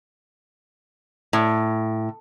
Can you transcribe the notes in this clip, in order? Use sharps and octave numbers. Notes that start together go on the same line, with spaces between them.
A2